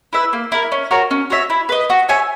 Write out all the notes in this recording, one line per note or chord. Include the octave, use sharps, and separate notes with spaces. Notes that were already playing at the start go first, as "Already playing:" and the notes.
E4 B4 E5
A#3
E4 A#4
C#4
F#4 A#4 C#5
C#4
F#4 C#5 E5
E4
B4 D#5
F#4
C#5 E5 G#5